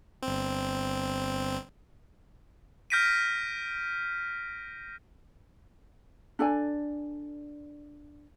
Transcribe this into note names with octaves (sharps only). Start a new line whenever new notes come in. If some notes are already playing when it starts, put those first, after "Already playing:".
G1 C4
F6 G6 A#6 B6 D7 D#7
D4 A4 D5 G#5